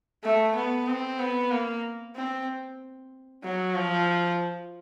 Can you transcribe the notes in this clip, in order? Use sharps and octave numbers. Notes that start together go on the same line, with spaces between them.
A3
B3
C4
B3
A#3
C4
F#3
F3